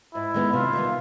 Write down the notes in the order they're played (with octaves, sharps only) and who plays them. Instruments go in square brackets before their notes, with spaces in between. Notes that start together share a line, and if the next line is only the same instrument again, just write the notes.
[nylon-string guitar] G#2 [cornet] E4
[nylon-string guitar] D#3 G#3 B3 D#4
[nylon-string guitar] C3 [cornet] F4
[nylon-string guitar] D#3 G3 B3